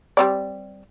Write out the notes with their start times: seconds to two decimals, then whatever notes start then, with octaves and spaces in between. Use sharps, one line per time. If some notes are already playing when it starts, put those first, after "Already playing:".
0.17 G3 C4 D5